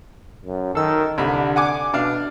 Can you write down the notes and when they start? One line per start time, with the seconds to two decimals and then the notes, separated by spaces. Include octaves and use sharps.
0.45 F#2
0.75 D#3 A4 E6
1.18 C2 D3 G3 B5
1.56 F#5 G#5 D6
1.94 B2 D4 F5